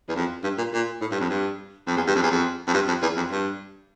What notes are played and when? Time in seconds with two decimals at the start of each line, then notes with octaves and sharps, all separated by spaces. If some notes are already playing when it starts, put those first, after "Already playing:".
0.09 E2
0.16 F2
0.44 G2
0.58 A#2
0.73 A#2
1.01 A2
1.11 G2
1.20 F2
1.30 G2
1.87 F2
1.97 E2
2.07 G2
2.15 F2
2.23 E2
2.31 F2
2.67 F2
2.74 G2
2.88 F2
3.02 E2
3.16 F2
3.31 G2